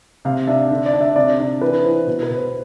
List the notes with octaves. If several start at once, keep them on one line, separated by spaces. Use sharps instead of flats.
C3 F5
D4 E5
D3
D5
D4
E5
C3 D5
D4
E3 B4
E3 C5
B2
B4
B2
C5